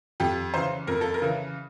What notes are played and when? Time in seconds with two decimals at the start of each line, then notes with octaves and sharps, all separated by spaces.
0.20 F2 G4
0.54 C#3 E3 C5
0.87 F2 A#4
1.01 A4
1.14 A#4
1.22 C#3 E3